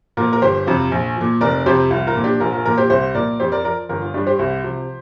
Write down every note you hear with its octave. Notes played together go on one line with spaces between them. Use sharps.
A#2 F3 F4 A#4
A#4
G1 G4 C5
F2 C3 F3 F4
A#1
A#2 F3
F1 A#4 D5
F2 C3 F3 G4 C5
C2 F4
F4 A#4
A#2 F3
D4 G4
A#1 F4 A#4
F4 A#4
A#2 F3 F4 A#4
G4 C5
C2 G4 C5
A#2 F3 A#4 D5
F2 G4 C5
A#4 D5
F3 A#4 D5
G1 F4 A#4
F4
G2 G3 D4 G4
G4 C5
C2
C3 F3